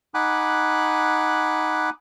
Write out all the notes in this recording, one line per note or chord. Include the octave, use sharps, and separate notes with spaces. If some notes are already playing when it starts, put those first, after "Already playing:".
D#4 F#5 G#5 B5 D6 F#6